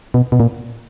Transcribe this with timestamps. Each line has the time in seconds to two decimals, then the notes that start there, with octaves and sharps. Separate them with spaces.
0.14 B2
0.32 B2
0.40 A#2